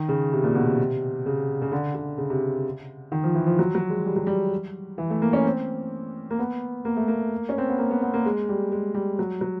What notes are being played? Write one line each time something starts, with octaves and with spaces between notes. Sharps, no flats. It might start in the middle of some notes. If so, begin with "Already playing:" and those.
Already playing: D#3
C#3
C3
A#2
B2
C3
C#3
C#3
D3
D3
C#3
C3
D#3
F3
E3
F3
F#3
F#3
G#3
G3
F#3
G3
E3
A3
A#3
C#4
C4
A#3
B3
A#3
A3
A#3
C#4
C4
B3
A#3
B3
B3
A#3
G#3
G3
G#3
G3
F#3
F#3